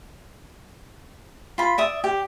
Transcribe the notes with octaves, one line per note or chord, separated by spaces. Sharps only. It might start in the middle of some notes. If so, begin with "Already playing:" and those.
F4 B5
D5 E5 D#6
G4